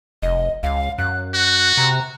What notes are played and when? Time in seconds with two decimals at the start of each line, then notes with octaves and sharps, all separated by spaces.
0.22 F1 D#5
0.63 C#2 F5
0.98 F#2 F#6
1.34 F#4 F#6
1.77 C3 A#5